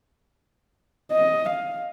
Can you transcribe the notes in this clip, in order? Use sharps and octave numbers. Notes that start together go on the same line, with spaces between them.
D#5
F5